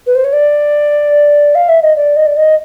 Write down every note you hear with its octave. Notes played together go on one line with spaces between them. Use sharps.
B4
C5
C#5
D5
F5
E5
D#5
D5
D#5
D5
D#5